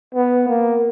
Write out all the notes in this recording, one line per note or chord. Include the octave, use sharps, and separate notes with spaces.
B3
A#3